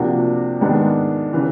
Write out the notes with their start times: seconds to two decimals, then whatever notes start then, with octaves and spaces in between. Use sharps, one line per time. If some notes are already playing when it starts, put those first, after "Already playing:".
Already playing: C3 F3 A#3 D4 F#4
0.61 G#2 D#3 G#3 B3 D4
1.33 C#3 E3